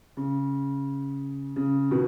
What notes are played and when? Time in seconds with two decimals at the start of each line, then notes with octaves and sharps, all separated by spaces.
0.17 C#3
1.56 C#3
1.91 B2 D#3